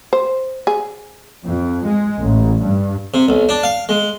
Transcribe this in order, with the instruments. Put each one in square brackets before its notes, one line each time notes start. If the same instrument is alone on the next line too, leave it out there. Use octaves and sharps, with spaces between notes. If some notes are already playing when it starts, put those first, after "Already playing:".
[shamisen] C5
G#4
[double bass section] F2
G#3
A1
G2
[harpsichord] C3
B1
D4
F5
G#3